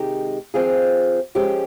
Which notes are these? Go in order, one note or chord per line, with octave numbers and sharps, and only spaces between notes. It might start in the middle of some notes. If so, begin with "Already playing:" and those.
Already playing: C3 D#3 G#3 D#4 G4
F3 C4 F4 G#4
F3 G#3 C#4 G4